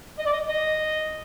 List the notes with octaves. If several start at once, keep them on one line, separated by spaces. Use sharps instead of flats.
D#5
D5
D#5
D#5